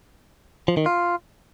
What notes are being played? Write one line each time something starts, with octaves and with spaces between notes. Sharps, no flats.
F3
D#3
F4